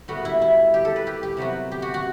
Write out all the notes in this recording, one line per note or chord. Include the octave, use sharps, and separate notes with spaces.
A2 G3 B3 F#4
E4
E4
G4
A4
B4
G4
G4
C3 F#3 B3 F#4
G4
F#4
F#4